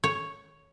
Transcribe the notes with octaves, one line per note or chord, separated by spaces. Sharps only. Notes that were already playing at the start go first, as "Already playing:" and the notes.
C#5